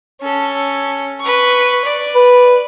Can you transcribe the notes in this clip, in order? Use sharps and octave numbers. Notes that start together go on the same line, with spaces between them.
C#4 A4
B4 C#6
D5
B4